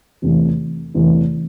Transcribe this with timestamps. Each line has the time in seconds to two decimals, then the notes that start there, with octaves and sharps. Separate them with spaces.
0.22 E2 C3 E3 A3
0.94 E2 C3 E3 A3